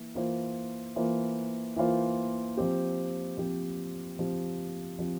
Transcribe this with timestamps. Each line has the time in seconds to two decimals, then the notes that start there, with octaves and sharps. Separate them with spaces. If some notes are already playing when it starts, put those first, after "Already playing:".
Already playing: E3 A#3
0.15 E3 A#3 F4 C5
0.96 E3 A#3 F4 C5
1.76 E3 A#3 F4 C5
2.57 F3 C4 G4
3.38 F3 C4 G4
4.19 F3 C4 G4
4.99 F3 C4 G4